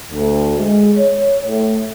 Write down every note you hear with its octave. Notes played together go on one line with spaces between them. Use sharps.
D2
G#3
C#5
A2